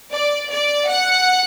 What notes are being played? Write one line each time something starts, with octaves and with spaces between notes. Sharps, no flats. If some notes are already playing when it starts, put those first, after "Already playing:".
D5
D5
F#5